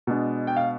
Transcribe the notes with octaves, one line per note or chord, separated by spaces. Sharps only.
B2 G#3 D4
G5
F5